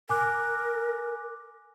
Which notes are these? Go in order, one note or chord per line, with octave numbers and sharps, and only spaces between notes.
A#4 G#5 D6 F#6